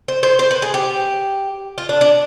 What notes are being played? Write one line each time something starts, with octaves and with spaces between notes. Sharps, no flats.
C5
C5
C5
B4
G#4
G4
F4
D4
D4